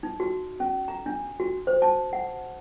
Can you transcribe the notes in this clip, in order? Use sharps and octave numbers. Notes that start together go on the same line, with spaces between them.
D#4
F#4
C#4
A#5
D4
F#4
C5
A5
F#5